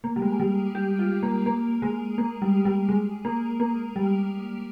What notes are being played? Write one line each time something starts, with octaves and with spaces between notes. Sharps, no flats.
A#3
G3
G#3
G3
G4
F4
A#3
A#3
G#3
A#3
G3
G3
G#3
A#3
A#3
G3